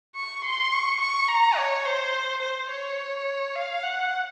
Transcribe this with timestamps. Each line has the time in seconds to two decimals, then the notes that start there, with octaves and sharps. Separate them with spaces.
0.16 C#6
0.44 C6
0.72 C#6
1.01 C#6
1.28 A#5
1.58 C#5
1.86 C5
2.42 C5
2.71 C#5
3.55 F5
3.84 F#5